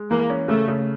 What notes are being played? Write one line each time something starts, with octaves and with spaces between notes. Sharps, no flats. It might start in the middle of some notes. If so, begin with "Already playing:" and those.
Already playing: G#3
E3 A#3
C#4
C#3 A3
C#3